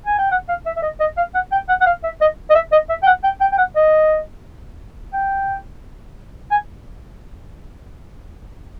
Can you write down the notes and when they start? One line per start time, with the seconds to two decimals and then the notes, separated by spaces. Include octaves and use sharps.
0.06 G#5
0.18 G5
0.31 F#5
0.49 F5
0.66 E5
0.77 E5
0.82 D#5
1.00 D#5
1.17 F5
1.35 F#5
1.52 G5
1.69 F#5
1.81 F#5
1.86 F5
2.04 E5
2.21 D#5
2.50 D#5
2.55 E5
2.72 D#5
2.89 E5
3.03 G5
3.07 F#5
3.24 G5
3.41 G5
3.52 G5
3.58 F#5
3.76 D#5
5.13 G5
6.51 G#5